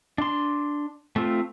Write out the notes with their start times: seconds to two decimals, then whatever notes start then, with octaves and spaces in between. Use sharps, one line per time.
0.18 D4 C6
1.16 A3 C4 F4